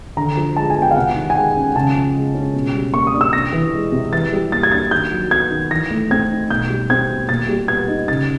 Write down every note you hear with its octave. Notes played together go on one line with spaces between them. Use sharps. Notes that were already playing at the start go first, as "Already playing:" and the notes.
D3 A#5
F3
G#3 A5
G#5
B3
G5
F5
C3 F#5
D#3
G#5
G#3 G5
C#4
C#3 A5
F3
G#3
C#4
B2
G3
A#3 C#6
D#6
D4
E6
C3 A#6
E3
G#3
C3
E3 A6
G3
A#3 A6
G#6
D4 A6
D#3 G6
F#3
B3 G#6
D#3
E3 A#6
A3
C4 G#6
D#4
B2 G6
G3
C4 G#6
B2
A#2 A6
G3
B3 G#6
D#4
C#3 A6